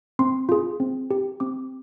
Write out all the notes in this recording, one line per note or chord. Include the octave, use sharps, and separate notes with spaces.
C4 C6
F4 G#4
C4
G4
C4 D6